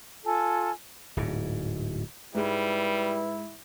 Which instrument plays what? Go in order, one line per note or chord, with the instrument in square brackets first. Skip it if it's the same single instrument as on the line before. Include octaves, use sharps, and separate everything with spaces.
[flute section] F4 A4 G#5
[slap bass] D1 G#2
[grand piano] G#2 G#3 [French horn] G3 [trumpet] E4 [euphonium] B4